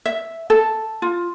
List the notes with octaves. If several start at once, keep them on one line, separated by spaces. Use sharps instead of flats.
E5
A4
F4